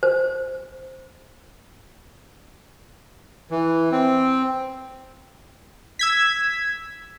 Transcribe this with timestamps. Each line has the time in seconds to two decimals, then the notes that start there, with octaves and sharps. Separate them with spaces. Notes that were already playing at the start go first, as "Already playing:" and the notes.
0.03 C5
3.51 E3
3.92 C4
5.99 E6 G#6 B6